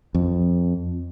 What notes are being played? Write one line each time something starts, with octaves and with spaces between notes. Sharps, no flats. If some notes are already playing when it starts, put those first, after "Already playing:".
F2